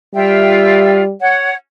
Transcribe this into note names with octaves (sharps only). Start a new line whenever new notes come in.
G3 F4 E5 G5
C#5 F#5